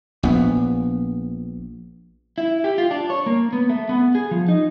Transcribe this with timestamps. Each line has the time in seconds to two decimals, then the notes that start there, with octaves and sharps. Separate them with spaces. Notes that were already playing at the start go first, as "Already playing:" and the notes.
0.23 A#1 B3
2.38 E4
2.64 G4
2.78 F4
2.91 D4
3.10 C#5
3.26 A#3
3.53 B3
3.70 A3
3.89 B3
4.15 G#4
4.31 F3
4.48 D#4